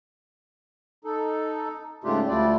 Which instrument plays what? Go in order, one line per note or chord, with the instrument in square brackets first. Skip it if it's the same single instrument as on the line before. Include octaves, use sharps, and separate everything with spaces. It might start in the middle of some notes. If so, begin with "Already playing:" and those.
[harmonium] D#4 A4
G#2 C#3 A3 D4 F4 G4
D2 G3 A3 E4 F4 D5